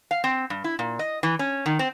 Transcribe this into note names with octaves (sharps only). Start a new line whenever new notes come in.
F5
C4
G2
E4
A#2
D#5
E3
C#4
D#3
C4